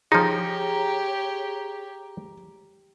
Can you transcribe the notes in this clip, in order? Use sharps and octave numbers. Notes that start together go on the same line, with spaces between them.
F3 D#4 G4 G#4 C#5 A#5